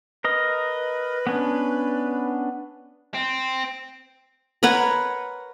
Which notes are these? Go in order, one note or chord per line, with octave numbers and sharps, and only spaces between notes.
A#4 B4 D#5
B3 C#4 D4
C4
A#4 B4 C#5 F#5